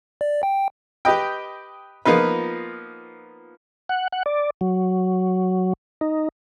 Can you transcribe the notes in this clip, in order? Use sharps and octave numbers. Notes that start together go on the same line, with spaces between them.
D5
G5
G4 B4 D#5 G5
F3 A#3 B3 D#4 F4 B4
F#5
F#5
D5
F#3
D#4